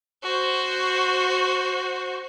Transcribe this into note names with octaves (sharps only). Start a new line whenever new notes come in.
F#4 C5